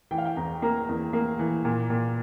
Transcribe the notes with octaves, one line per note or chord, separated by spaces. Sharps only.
E3 G5
F5
G5
E2 A#5
A#3 A#5
E2
A#3
E3
A#2
A#2